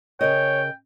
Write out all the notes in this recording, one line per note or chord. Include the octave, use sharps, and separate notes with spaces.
C#3 A#4 C#5 D#5 G5